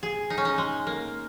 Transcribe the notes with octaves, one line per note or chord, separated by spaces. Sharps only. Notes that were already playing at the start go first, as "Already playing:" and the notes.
G#4
D#4
C#4
D#4
G#3
A#3